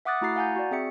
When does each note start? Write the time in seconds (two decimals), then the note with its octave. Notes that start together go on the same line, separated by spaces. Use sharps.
0.05 E5 F#5 D6 D#6 F#6 A6
0.21 A3 E4 F#4 A#5 A6 C7
0.36 F5 F#5 G#5 A#5 G6
0.56 F#4 D5
0.71 C4 G#4 E5 C#7